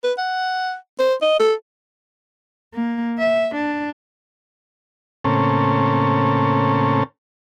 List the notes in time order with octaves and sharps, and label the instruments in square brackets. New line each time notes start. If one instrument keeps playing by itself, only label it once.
[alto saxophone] B4
F#5
C5
D#5
A4
[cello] A#3
E5
D4
[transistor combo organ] A2 C#3 A#3 C4 C#4 A4